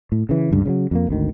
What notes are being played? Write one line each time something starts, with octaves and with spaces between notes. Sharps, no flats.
A2
C#3 E3
C#2 G2 D3
C#3 E3 F#3
F2 G3 A#3
G#1 D2 D#3